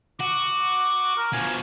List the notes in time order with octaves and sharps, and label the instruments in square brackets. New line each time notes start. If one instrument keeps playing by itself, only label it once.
[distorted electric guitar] F#4 [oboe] D6
[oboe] A#4
[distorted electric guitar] B2 F3 [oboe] G#5